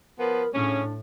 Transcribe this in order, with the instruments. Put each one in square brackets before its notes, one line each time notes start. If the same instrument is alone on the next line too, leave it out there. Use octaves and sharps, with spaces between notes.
[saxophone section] F3 B3 [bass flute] A#4
[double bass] A2 [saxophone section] C#3 C#4 [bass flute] D4